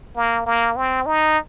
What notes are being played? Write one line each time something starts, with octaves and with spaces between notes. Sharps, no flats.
A#3
A#3
C4
D#4